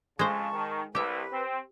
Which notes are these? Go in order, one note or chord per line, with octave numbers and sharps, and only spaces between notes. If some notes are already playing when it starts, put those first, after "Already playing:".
F2 C#3 G#3 C5 A5 C#6
D#3
C2 G4 B4 E5
C4